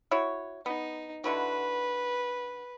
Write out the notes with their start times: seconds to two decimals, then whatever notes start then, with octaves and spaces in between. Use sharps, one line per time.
0.11 E4 F#4 C#5
0.66 B3 D#4
1.24 D3 E4 F#4 B4